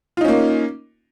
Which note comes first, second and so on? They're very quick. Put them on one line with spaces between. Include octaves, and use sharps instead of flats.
F4 D#4 C#4 A#3